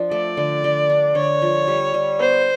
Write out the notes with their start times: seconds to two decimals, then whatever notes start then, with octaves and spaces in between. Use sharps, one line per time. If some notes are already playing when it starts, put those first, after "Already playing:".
Already playing: F3 D4
0.11 A3 D5
0.37 D3
0.64 D3
0.90 D4
1.15 D3 C#5
1.42 F3
1.68 G3
1.94 G3
2.19 B3 C5